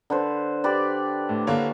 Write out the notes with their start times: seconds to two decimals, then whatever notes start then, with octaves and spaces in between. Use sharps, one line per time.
0.10 D3 B4 C5
0.64 G4 B4 D5
1.29 A2
1.47 D3 A#3 E4 C#5